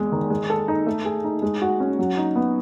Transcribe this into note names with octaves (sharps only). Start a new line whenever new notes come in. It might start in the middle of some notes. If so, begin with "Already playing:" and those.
Already playing: E2 G#3
D#3
G#3
A4
D#4
A3
G#4
D#4
G#3
F#4
C#4
F#3
D#4
B3